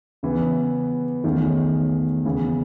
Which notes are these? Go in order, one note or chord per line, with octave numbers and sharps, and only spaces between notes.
C#3 E3 B3
E2 D#3 A3 C#4
E2 C#3 E3